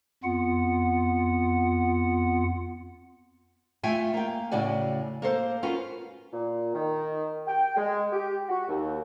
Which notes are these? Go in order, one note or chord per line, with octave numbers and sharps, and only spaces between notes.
F2 B3 F4 F#5
A3 F4 E5 G5 G#5
A#3 G5
A2 C#3 F#4 D5 G#5
A#3 A4 C5
C#4 F4 F#4 A#4 B4
A#2
D#3
G5
G#3
G4
F#4
D#2